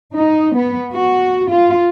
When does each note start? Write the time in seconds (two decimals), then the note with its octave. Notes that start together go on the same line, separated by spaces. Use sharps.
0.15 D#4
0.55 B3
0.93 F#4
1.50 F4